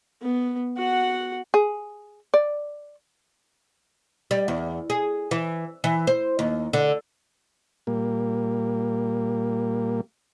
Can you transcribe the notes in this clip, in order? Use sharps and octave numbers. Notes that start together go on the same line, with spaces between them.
B3
F#4 F#5
G#4
D5
G3
E2
G#4
E3
E3
C5
D#2
D3
A#2 G3 A#3